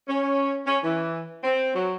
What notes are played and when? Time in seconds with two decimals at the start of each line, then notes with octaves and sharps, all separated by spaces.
0.08 C#4
0.66 C#4
0.84 E3
1.44 C4
1.75 F#3